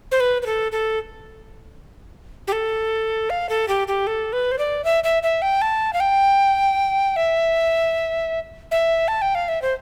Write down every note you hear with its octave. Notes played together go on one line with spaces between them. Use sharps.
C5
B4
B4
A4
A4
G4
A4
F5
A4
G4
G4
A4
B4
C5
D5
E5
E5
E5
G5
A5
F5
G5
E5
E5
A5
G5
F5
E5
C5